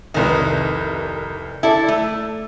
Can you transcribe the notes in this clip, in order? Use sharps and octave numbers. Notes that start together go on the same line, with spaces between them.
F1 C2 D#3 B4
E4 A4 D5 A5
A3